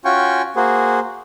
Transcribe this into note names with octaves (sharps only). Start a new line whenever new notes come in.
C#4 F4 F#4 G5 G#5 C#6
A#3 F#4 G#4 C5